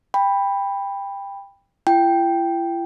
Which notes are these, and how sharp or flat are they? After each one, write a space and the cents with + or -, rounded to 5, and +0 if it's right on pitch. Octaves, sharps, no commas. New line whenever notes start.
G5 +20 B5 +0
E4 +45 G5 +0